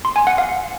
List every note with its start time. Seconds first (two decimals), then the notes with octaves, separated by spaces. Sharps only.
0.05 C6
0.16 G#5
0.27 F#5
0.38 F5